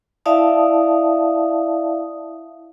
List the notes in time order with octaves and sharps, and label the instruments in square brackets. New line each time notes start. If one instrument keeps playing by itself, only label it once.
[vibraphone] E4 D5 E5 F5 A5 D#6